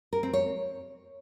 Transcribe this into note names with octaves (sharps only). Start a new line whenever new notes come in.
A#4
C4
C#5